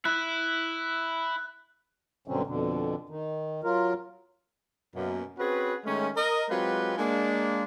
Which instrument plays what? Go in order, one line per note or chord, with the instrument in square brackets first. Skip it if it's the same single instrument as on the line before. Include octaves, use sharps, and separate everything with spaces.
[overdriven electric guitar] E4 [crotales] F#6
[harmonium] G2 B2 D3 F#3 C4 C#4
F2 B2 D3
D#3
F#3 F4 A#4
[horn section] F#2 B2 A#3
C4 C#4 F#4 G#4 B4
D#3 G#3 A3 C#4
A#4 D#5
F#3 G#3 C4 F4 G4 B4
G#3 A#3 D4